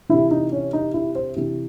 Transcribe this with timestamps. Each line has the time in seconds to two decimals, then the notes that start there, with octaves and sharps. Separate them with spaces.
0.09 C3 E3 E4
0.31 D#4
0.52 C#4
0.73 D#4
0.94 E4
1.15 C5
1.36 C3 E3